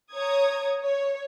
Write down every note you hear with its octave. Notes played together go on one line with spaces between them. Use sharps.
C#5 A#5 D#6 G#6
C#5